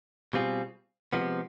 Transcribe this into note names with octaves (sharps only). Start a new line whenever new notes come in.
B2 G3 C4 F4 G#4
C3 F3 G#3 B3